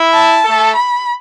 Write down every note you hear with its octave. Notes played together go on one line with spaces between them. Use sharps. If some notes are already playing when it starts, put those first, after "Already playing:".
Already playing: E4
A5
A3 A4
B5